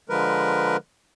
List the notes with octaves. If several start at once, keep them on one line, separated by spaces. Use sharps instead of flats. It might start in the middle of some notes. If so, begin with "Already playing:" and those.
D3 F3 G#3 A#4 B4